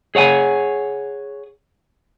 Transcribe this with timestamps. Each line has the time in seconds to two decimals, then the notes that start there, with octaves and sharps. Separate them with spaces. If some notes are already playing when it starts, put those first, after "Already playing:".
0.15 G#4 C#5 F#5 G#5